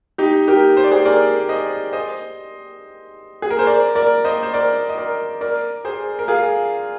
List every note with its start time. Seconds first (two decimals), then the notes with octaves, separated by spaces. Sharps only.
0.18 D#4 G4
0.48 G4 A#4
0.77 C5
0.84 D5
0.91 G#4 C5
1.05 A#4 D5
1.49 C5 D#5
1.93 C5 D#5
3.42 G#4
3.51 A#4
3.59 C5
3.67 A#4 D5
3.95 A#4 D5
4.25 C5 D#5
4.43 C5
4.54 A#4 D5
4.89 D#5
4.97 A#4 D5
5.41 A#4 D5
5.85 G#4 C5
6.19 A#4
6.28 F4 G#4